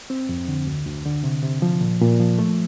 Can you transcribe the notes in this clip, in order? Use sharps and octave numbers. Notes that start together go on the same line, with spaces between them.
C4
F2
D3
D2
D2
D3
C3
C3
F3
A#2
A#2
F3
A3